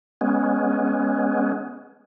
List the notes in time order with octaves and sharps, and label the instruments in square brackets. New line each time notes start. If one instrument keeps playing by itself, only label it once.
[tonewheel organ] G#3 B3 C#4